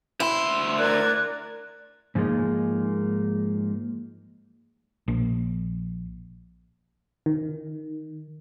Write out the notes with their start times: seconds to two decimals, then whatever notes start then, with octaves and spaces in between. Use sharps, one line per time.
0.20 D2 E4 C6
0.79 A#4 D5 F#6 G#6
2.15 G#2 F3 G#3 A#3 D#4
5.08 A#1
7.26 D#3